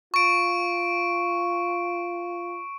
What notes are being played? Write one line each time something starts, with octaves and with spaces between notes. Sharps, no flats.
F4 C#6 D7